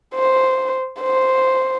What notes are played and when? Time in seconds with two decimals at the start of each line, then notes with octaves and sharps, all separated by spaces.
0.15 C5
1.01 C5